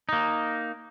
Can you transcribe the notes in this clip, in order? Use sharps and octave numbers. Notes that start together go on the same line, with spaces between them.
A#3 D#4